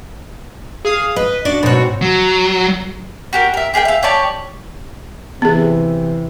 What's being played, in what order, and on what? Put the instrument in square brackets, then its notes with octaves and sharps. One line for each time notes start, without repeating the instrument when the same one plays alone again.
[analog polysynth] G#4 F5 D#6
[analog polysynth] B4 [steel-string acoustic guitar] D#5
[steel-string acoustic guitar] D4 D5 [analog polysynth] F#4
[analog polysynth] G#2 C4 F#4 [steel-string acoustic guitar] B2 C#5
[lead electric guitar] F#3
[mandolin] F#4 G4 A#4
A#4 E5
G4 G#4 A#4 G5
E5 F5
G4 C#5 D5 A5
[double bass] C3 E3 [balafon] B3 G#4